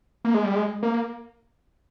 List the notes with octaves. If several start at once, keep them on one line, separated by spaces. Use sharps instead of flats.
A#3
G#3
G3
G#3
A#3